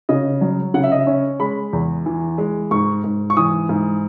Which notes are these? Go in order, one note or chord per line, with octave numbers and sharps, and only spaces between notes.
C#3 D#5
F#3
C#3 F#5
E5
D#5
E5
C#4
G#3 B5
E2
E3
G#3
G#2 C#6
G#2
C#6
E3 D#6
G#2